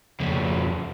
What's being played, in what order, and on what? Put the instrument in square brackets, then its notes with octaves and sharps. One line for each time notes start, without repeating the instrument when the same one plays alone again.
[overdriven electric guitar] F2 C#3